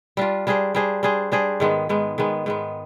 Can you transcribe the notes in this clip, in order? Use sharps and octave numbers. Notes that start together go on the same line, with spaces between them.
G3 D4 F4
G3 D4 G#4 C5
G3 D4 G#4 C5
G3 D4 G#4 C5
G3 D4 G#4 C5
G#2 D#3 G#3 B3
G#2 D#3 G#3 B3
G#2 D#3 G#3 B3
G#2 D#3 G#3 B3